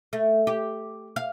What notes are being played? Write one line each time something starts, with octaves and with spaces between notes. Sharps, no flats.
A3
G4
F5